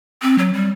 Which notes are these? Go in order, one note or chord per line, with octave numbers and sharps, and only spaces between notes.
C4
F#3
G3